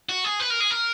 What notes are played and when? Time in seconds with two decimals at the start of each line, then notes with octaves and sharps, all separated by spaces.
0.09 F#4
0.24 G#4
0.40 B4
0.50 A#4
0.60 G#4
0.71 A#4